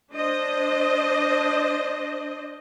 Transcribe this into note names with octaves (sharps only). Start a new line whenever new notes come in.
D4 C5 D#5